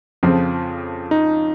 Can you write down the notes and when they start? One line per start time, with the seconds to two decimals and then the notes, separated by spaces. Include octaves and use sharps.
0.23 F2 C#3 F3 C4 F4
1.11 D#4